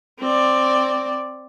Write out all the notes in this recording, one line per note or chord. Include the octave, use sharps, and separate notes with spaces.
C4 D5